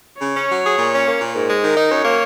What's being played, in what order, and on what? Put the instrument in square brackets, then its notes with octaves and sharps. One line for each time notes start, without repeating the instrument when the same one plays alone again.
[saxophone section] C#3 [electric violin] C#5
[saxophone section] C#4
F#3
G#4
A#2
C#4
A#3
A#2
[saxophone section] G#2 [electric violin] A#4
[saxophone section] G#3
[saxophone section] D#3 [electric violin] A#4
[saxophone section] D#4
[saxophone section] F#2 [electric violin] C#5
[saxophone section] A#3